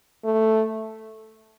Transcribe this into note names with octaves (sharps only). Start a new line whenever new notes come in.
A3